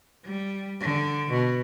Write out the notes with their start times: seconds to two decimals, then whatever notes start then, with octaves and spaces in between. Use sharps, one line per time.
0.25 G3
0.81 D3
1.31 B2